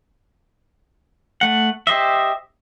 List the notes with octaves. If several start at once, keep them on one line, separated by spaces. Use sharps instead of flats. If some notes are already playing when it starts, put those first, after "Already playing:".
A3 F#5
G4 C5 D#5 E5